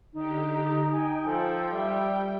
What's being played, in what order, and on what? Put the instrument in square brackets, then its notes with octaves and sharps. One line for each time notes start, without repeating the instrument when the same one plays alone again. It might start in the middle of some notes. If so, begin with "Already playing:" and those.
[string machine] D3 G4 [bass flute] D#4
[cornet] A#5
[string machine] G5 [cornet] G#5
[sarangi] F3 [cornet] A4
[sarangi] G3 [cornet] E5